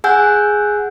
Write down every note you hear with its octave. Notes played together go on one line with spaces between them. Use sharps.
G#4 F#5 G#5 E6 F#6 G6